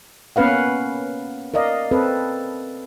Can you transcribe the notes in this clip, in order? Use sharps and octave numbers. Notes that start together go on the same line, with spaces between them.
A#3 B3 C#4 B4 F5 F#5
A#4 D5 D#5 F5
C4 A4 B4